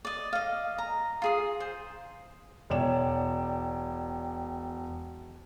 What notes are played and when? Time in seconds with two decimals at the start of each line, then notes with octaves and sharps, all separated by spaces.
0.05 D5 D#5
0.33 D#5 F5
0.78 A#5
1.22 F4 G#4 D#6
1.60 C5
2.70 E1 C#5 D5 G5 E7